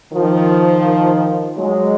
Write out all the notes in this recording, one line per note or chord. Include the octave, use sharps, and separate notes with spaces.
D#3 F3
F#3 G#3